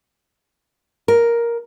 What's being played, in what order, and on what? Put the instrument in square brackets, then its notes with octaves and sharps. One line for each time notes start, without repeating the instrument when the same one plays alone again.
[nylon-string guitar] A#4